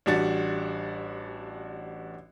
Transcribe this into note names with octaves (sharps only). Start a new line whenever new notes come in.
A1 G3 D4 F#4 A6